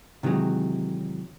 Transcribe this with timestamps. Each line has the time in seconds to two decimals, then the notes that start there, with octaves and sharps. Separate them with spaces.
0.23 C3 D#3 E3 F#3 G#3